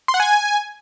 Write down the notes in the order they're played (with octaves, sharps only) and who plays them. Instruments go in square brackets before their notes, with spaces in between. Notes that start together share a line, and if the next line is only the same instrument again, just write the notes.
[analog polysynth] C6
F#5
G#5